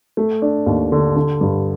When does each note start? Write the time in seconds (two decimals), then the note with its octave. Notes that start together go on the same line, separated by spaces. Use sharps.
0.17 A3
0.42 D4
0.66 D#2
0.92 D3
1.16 D3
1.41 G2